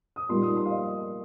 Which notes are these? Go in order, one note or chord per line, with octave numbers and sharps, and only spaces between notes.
D#6
A#2 G3 A#3 D#4 C6
D#6
C6
F5
D#5